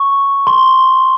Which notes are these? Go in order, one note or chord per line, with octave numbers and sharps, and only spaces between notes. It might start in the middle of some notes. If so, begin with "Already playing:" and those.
Already playing: C#6
C6